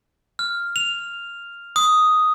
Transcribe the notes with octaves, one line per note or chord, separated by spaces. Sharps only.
F6
F7
D#6